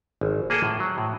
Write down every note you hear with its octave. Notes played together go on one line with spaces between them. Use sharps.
G#1
A#3 G#4 A4 F#5 G5
A2
F#3
A2